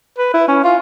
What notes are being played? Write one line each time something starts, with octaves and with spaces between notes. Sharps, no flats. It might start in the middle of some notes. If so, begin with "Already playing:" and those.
B4
E4
C#4
F4